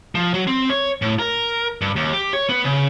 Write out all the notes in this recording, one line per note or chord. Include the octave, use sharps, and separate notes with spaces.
F3
F#3
C4
C#5
A2
A#4
G2
D#2
G4
C#5
B3
C#3